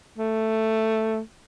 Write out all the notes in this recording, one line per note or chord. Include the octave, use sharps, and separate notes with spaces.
A3